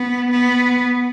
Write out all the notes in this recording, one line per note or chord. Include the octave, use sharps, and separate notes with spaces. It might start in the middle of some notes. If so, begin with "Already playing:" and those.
Already playing: B3
B3